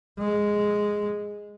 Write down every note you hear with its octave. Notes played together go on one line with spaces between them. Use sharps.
G#3